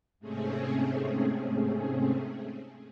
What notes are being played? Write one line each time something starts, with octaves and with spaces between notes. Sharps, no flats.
G#2 C3 A3 C4 C#4 G#4